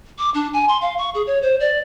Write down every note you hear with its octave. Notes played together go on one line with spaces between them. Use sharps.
D6
D4
G#5
C6
F5
C#6
G#4
C#5
C5
D5